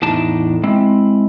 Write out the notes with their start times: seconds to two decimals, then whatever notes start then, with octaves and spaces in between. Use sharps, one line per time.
0.02 E2 A2 D4 D#4 A5
0.63 G#3 C4 E4